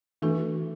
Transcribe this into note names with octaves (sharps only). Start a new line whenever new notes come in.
E3 A3 D4 F#4 A4